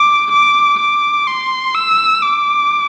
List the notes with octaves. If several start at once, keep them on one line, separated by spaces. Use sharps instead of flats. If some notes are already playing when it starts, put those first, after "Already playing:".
Already playing: D6
D6
D6
C6
E6
D6